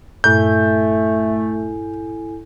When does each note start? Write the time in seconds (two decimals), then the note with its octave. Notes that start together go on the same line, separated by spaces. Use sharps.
0.24 G2 A#2 A3 E4 A4 G#5 F#6 G6